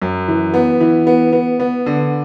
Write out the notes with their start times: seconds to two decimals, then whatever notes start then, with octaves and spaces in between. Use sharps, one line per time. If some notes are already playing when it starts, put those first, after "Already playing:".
0.02 F#2
0.28 E3
0.54 B3
0.81 E3
1.07 B3
1.32 B3
1.60 B3
1.86 D3